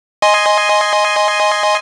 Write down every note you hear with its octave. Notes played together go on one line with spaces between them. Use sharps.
D#5 G#5 C6